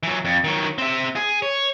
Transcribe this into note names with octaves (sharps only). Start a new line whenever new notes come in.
E3 F#3
F2
D#3 F#3
C4 E5
G#4
C#5